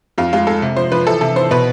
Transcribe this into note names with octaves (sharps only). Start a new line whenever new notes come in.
F2 F4
G#3 F4
G#3 A4
C3
F3 C5
F3 B4
E3 A4
C3 A4
E3 C5
B2 B4